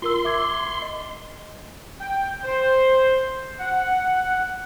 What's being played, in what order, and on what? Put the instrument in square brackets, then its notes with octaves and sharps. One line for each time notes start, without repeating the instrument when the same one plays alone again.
[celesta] F4 A#4 E6 [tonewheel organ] C6
[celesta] E5 D6 G#6
D#5
[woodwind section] G5
C5
F#5